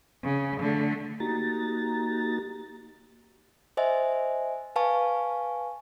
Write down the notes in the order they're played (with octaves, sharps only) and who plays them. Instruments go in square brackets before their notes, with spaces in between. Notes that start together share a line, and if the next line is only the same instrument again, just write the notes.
[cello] C#3
D3 A3
[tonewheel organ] A#3 D#4 F#4 G4 A#5 A6
[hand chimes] C5 D#5 E5 G#5
B4 F5 G#5 A5 C#6